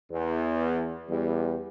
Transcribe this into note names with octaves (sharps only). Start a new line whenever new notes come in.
E2
E2 G3